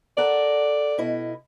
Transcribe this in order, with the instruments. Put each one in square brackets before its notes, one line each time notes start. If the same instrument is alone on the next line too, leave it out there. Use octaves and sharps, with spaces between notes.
[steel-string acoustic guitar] A4 A#4 F#5 [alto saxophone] D5
[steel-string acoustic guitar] B2 E4 D#5